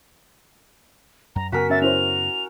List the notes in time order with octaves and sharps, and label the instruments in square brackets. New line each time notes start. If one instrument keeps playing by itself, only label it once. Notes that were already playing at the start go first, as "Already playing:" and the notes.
[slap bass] F#2 [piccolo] A#5
[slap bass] F#2 C#3 B3 [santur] F#4 A#4 G#5 [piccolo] B6
[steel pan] C#4 E5 [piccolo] A6
[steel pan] C#4 E4 C5 [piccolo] F7